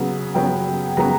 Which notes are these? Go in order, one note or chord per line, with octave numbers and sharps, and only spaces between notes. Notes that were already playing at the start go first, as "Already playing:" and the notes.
Already playing: C#3 F#3 B3
C#3 F#3 B3 G5
C#3 F#3 B3 A#5